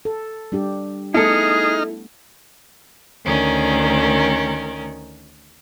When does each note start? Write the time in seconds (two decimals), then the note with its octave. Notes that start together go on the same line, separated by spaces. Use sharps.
0.05 A4
0.52 G3 D4 G4
1.14 A3 B3 D#4 E4 G#4 A4 F6
3.25 D2 D#3 C#4 A#4